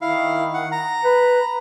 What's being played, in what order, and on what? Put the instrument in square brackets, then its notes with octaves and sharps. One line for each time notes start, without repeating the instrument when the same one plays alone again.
[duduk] D#3 [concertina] E4 F5
[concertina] F#5
A#5
[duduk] B4